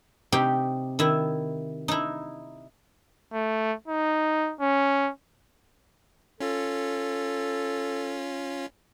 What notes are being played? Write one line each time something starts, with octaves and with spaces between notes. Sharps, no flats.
C3 D#4 G4 G5
D#3 E4
D#4 E4
A3
D#4
C#4
C#4 F4 A4